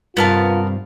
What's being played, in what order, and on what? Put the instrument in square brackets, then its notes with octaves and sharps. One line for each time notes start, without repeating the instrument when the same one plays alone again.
[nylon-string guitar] G2 C3 [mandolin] B3 A#4 A5 [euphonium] F4